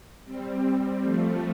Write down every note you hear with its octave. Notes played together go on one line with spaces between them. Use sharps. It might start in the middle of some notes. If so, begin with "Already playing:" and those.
G3 C4
F3 A3